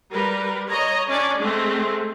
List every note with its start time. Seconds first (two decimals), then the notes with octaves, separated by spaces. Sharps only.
0.12 G3 A#4 B4
0.68 C#5 D#5 A#5
1.09 C#4 D4 D5
1.39 G#3 A3 C4